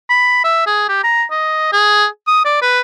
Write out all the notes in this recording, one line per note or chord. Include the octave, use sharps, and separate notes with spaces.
B5
E5
G#4
G4
A#5
D#5
G#4
D#6
D5
B4